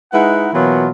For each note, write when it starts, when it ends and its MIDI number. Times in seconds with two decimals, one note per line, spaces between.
0.13 0.49 56
0.13 0.49 63
0.13 0.49 64
0.13 0.49 71
0.13 0.49 78
0.54 0.90 47
0.54 0.90 52
0.54 0.90 54
0.54 0.90 58
0.54 0.90 59
0.54 0.90 65